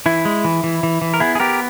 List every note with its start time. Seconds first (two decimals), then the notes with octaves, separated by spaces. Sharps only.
0.06 E3 E4
0.25 G#3
0.44 E3
0.64 E3
0.83 E3
1.02 E3
1.14 A#4
1.20 B3 E4 G#4
1.35 G#4
1.40 B3 G4 A#4